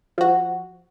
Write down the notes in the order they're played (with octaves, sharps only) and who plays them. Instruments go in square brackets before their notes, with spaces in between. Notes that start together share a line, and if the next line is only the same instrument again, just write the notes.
[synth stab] F3 F#4